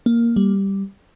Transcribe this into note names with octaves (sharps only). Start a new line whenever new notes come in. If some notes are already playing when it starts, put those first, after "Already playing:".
A#3
G3